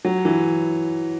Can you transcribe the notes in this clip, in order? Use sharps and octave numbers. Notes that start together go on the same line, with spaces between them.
F#3
E3